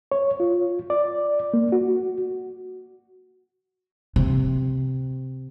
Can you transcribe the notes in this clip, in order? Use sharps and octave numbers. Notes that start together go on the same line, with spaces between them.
C#5
F4
D5
A#3
F#4
C3